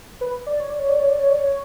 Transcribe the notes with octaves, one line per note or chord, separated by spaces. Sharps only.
B4
D5
C#5
D5
C#5
D5
C#5
D5
C#5
D5
C#5